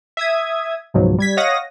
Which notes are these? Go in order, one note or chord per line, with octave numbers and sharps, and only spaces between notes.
E5 D#6 G#6
C#2 G#2 B2 F3 F#3
G3 G#6 B6
C#5 D#5 F5 F#5 D#6 A#6